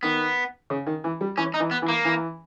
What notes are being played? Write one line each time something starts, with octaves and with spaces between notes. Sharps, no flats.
D#3 B3
C#3
D#3
E3
G3
E3 C#4
D#4
E3
B3
E3
A#3
E3